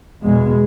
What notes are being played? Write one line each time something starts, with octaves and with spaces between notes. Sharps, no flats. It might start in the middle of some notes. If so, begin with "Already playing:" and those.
E2 B2 G#3